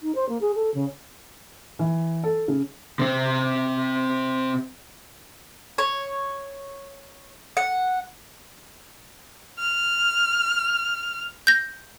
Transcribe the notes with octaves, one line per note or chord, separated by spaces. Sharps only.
D#4
C5
A#3
G#4
A4
C#3
E3
A4
C#3
C3 C4
C#5
F#5
F6
G6 A#6